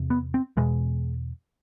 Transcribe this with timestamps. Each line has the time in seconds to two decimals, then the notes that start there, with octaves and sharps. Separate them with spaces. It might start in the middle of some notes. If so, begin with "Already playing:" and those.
Already playing: E2 C3
0.10 B3
0.34 C4
0.57 E2 B2 G#3